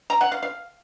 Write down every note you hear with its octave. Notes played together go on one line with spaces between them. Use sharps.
A#5
F#5
F5
F5